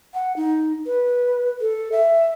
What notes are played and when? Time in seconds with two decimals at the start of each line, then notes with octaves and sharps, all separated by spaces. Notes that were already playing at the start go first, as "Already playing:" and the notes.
0.14 F#5
0.36 D#4
0.86 B4
1.61 A4
1.92 E5